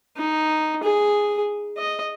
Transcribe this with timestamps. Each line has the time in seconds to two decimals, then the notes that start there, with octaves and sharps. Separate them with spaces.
0.16 D#4
0.83 G#4
1.77 D#5